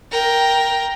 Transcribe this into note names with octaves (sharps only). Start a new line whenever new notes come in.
A#4 G5